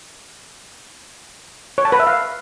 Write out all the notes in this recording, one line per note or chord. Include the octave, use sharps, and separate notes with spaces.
C#5
A5
B4
E5
F5